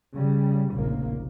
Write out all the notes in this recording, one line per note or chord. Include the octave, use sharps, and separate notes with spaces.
C#3 G3
F1 A#1 C#3 A#3